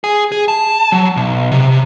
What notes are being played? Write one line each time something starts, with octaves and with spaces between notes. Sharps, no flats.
G#4
G#4
A5
F#3
B1
C3